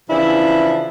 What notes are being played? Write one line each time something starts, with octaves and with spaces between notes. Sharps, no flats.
C#3 E3 F3 D4 E4